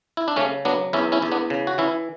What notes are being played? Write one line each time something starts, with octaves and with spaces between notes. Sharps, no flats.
E4
D4
C#3 A3 C#4
F#3 B3 D4
E2 C#4 E4
C#4 E4
E2
B3 D4
C#3
F#4
E3 C#4 E4